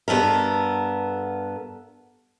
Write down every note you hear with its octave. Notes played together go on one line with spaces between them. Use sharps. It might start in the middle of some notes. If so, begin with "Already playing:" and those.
G2 B3 A4 A#4